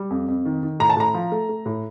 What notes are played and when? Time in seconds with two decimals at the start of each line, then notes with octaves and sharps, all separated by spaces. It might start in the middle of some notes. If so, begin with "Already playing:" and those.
Already playing: G3
0.10 F2
0.28 F2
0.45 D#3
0.63 D#3
0.80 A2 A#5
0.90 A5
0.96 A2 A#5
1.14 F3
1.32 A3
1.49 A3
1.66 A2